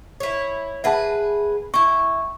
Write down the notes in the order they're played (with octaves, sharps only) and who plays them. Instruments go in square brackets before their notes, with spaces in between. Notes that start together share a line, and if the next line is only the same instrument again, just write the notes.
[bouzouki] E4 C#5
[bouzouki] G#4 B4 [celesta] E5 F#5 A5
[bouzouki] E4 G5 [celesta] C#6